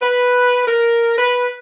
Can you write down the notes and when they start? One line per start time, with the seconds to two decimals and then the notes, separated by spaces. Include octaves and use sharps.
0.02 B4
0.67 A#4
1.17 B4